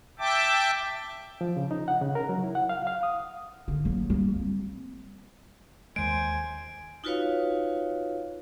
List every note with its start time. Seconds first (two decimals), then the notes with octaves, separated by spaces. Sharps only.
0.19 E5 G5 A5 D6
1.41 F3
1.57 C#3
1.71 D#4
1.88 F#5
2.01 C#3
2.15 A#4
2.29 F#3
2.43 E4
2.55 F#5
2.69 F5
2.87 F5
3.03 D#6
3.68 D3 D#3
3.85 F#3 A#3
4.10 G3 A#3
4.36 C4
5.96 D#2 G#3 C5 G#5 D7
7.04 D#4 F4 F#4 B4 C#5 F5